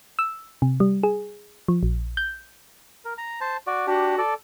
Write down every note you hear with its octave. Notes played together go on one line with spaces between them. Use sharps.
E6
C3
G3
G#4
F3
A#1
G6
A#4
A#5
C5 A5
F#4 D5
D4 F#4 G4
A4 D5